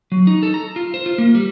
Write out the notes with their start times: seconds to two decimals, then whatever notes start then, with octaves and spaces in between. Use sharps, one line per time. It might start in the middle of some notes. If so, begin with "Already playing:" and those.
0.12 F#3
0.27 D#4
0.43 A4
0.54 A#5
0.76 F4
0.94 C5
1.06 F4
1.18 A#3
1.35 G3